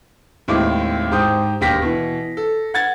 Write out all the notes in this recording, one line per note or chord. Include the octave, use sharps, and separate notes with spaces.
D#2 A2 G#3 C4 E4 D6
G#2 G4 C5 G5 D#6
E1 D#2 G4 A#6 B6
B2 E3
A4
F#5 G#6 A6